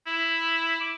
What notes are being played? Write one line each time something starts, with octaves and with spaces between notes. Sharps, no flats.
E4
D6